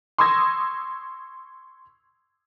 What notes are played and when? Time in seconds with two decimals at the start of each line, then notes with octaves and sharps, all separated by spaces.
0.18 C6 C#6 D#6 E6 G#6 A#6